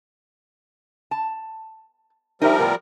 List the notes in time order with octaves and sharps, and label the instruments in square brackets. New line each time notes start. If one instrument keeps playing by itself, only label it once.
[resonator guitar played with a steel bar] A5
[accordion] F3 G3 A#4 [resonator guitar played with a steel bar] D#4 E5
[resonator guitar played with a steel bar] A2 B3 G5